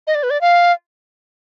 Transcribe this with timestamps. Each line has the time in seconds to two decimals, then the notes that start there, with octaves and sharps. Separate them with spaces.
0.07 D#5
0.15 D5
0.23 B4
0.30 D5
0.41 F5